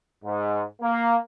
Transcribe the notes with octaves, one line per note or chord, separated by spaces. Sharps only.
G#2
A#3